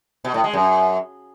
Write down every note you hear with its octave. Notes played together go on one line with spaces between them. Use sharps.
B2
A2
G#3
F#2